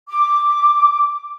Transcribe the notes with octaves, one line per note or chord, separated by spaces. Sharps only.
D6